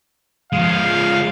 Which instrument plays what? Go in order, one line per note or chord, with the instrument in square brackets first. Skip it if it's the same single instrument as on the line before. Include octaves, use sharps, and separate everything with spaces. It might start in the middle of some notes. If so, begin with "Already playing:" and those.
[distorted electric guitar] F3 G#3 [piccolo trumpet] F5